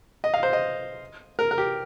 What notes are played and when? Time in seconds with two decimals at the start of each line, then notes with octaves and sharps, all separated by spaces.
0.24 D#5
0.34 F5
0.43 C5
0.53 D#5
1.39 A#4
1.51 A#4
1.58 G4